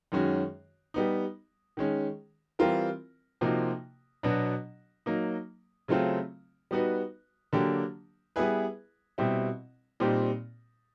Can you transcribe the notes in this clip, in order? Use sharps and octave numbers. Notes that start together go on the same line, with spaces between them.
F#2 D#3 G#3 C#4 F#4
G3 B3 D#4
D#3 G#3 C#4
E3 G3 C4 F4 A#4
C3 F3 A#3 D#4 F#4
B2 F#3 B3 D4 F#4
F#3 A#3 D#4
C#3 F#3 A3 C4 F4
G3 B3 D#4 F#4 B4
D3 F#3 A#3 D4 G4
G3 B3 E4 G#4 B4
B2 G3 C4 E4
A#2 G3 C4 D#4 G4